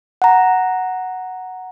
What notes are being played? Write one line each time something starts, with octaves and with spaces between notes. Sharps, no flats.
F#5 A#5